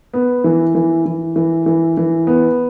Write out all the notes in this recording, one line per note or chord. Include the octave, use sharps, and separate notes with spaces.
B3
E3
E3
E3
E3
E3
E3
B3